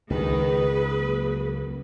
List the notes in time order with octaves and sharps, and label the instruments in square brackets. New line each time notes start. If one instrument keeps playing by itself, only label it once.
[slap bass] C#2 [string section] D#3 D#4 A#4 [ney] G#4 [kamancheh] B4
[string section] F#3 A#3